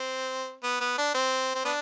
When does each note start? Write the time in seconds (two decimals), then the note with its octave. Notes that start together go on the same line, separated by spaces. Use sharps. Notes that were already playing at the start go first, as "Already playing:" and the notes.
Already playing: C4
0.64 B3
0.80 B3
0.98 D4
1.14 C4
1.55 C4
1.65 B3 D4